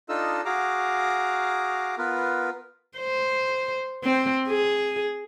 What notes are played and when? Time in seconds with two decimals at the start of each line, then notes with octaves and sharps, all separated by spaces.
0.09 D4 D#4 F4 A4 D#5 E6
0.45 F#4 G#4 F5 A#5 D6
1.98 B3 F4 A#4 B4
2.98 C5
4.04 C4
4.48 G#4